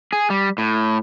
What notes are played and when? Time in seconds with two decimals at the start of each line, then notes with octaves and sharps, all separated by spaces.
0.13 G#4
0.30 G3
0.58 A2